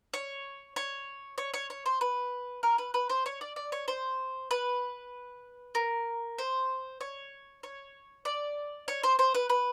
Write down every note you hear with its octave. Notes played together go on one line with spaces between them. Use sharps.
C#5
C#5
C#5
C#5
C#5
C5
B4
A#4
B4
B4
C5
C#5
D5
D5
C#5
C5
B4
A#4
C5
C#5
C#5
D5
C#5
C5
C5
B4
B4